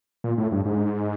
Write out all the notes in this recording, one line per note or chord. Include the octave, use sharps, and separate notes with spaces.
A#2
A2
G2
G#2